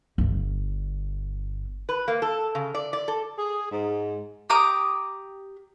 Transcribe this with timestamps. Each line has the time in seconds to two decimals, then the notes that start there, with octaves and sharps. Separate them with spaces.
0.18 G1 D3
1.89 B4
2.08 A#3
2.22 A4
2.55 C#3
2.75 D5
2.93 D5
3.08 A4
3.37 G#4
3.71 G#2
4.50 G4 A#5 D6 D#6